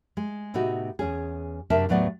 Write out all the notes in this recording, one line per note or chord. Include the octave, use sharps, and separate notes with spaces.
G#3
A2 C3 B3 D#4 F#4
E2 C#4 G#4
F#2 C3 D4 A#4 E5 A5
D#2 A2 F#3 B3 D5 F#5